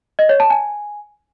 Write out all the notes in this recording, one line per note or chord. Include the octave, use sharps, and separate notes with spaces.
D#5
C#5
A5
G#5